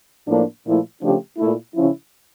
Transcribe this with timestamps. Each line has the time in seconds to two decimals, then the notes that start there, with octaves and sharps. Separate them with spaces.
0.28 A2 F3 A#3 D4
0.65 A#2 F3 A3 E4
1.01 C#3 F3 A3 D4 G4
1.37 A#2 A3 E4
1.75 C#3 F3 C#4 E4